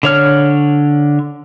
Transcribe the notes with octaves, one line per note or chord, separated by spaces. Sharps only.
D3 C#5 F6